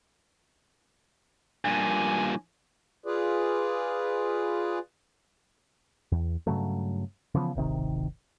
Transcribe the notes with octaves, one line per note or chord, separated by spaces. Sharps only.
G2 A#2 G#5
F4 G#4 B4 D5
E2
G2 C#3 F#3 A3
C#3 E3 F3 B3
D1 G#1 C3 D#3